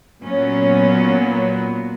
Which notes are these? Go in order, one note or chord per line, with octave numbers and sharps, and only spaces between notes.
A#2 F#3 B3 C#4